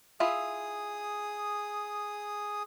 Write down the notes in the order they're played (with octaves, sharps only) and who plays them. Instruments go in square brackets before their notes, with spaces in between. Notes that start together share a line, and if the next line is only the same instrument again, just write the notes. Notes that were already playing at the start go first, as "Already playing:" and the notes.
[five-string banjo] E4 F4 E5 [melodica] G#4 D#6